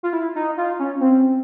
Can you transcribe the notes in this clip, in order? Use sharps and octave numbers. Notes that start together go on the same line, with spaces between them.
F4
E4
D#4
F4
C#4
C4